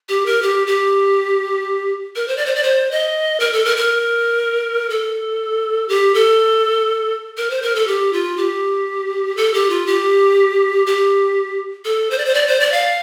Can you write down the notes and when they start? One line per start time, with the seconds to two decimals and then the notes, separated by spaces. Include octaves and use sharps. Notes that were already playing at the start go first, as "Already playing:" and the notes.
0.09 G4
0.26 A#4
0.42 G4
0.67 G4
2.16 A#4
2.28 C5
2.37 D5
2.46 C5
2.55 D5
2.63 C5
2.91 D#5
3.40 A#4
3.53 A4
3.65 A#4
3.77 A#4
4.90 A4
5.89 G4
6.14 A4
7.37 A#4
7.50 C5
7.62 A#4
7.75 A4
7.87 G4
8.13 F4
8.37 G4
9.37 A4
9.54 G4
9.70 F4
9.87 G4
10.86 G4
11.85 A4
12.11 C5
12.18 D5
12.25 C5
12.34 D5
12.47 C5
12.60 D5
12.72 F5